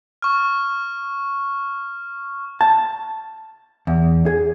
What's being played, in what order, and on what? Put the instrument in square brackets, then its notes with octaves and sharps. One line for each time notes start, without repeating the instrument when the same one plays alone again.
[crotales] C#6 F6
[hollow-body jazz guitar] A5
E2
G#4